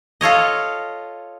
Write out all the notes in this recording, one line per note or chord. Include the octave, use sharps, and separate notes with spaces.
F4 A4 C#5 D#5